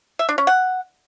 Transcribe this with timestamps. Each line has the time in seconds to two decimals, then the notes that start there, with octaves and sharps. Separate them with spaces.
0.19 E5
0.29 D4
0.38 C#4
0.47 F#5